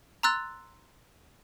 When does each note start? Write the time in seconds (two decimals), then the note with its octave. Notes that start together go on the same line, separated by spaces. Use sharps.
0.23 A#5 C6 E6 F#6 A6